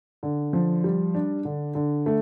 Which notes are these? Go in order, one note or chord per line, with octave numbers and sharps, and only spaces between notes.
D3
F3
G3
D4
D3
D3
A3